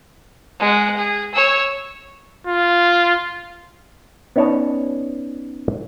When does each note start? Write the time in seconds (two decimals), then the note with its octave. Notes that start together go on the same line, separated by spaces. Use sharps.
0.60 G#3 F#5
0.96 G#4
1.34 C#5 E6
2.47 F4
4.36 B3 C#4 D#4 C#5 D5 A5